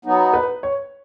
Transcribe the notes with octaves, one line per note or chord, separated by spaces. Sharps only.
F#3 B3 D#4
B4
C#5